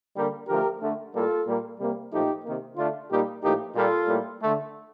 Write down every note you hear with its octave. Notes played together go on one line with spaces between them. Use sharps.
D3 G3 A#3 G4 A#4
D3 F3 A3 G4 A#4
D3 A3
A2 G3 A#3 F4 A4
A#2 G3 A#3
C3 G3 A#3
A#2 F3 A3 D#4 G4
C3 D#3 A#3
D3 A3 D4 F4
A#2 G3 A#3 D#4 G4
A2 F3 A#3 D#4 G4
A#2 G3 A#3 F4 A4
A2 G3 A#3
D3 A3